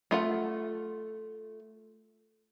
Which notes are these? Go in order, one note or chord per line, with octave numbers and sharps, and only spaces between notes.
A3 F4 F#5